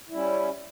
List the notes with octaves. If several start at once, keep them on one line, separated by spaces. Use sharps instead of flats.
G3 C#4 E4